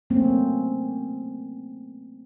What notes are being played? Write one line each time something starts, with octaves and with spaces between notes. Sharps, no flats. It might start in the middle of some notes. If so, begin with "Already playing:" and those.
F#3 A3 A#3 C4 C#4